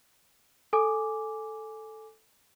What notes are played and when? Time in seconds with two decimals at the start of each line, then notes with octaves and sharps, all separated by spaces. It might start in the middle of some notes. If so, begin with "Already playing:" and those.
0.73 A4 G#5 D6